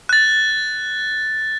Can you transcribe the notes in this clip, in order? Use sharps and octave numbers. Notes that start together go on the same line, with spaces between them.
F#6 A6